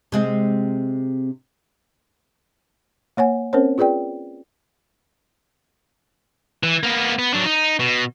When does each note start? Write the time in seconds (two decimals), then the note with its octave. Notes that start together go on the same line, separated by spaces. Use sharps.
0.12 C3 G#3 C4
3.17 A#3 C#5 F#5 G#5
3.53 C4 C#4 A#4 C5 C#5
3.78 F4 G#4 B4 D5 G5
6.63 E3
6.83 A#3 B3
7.19 B3
7.34 F#3 D4
7.46 D#4
7.79 B2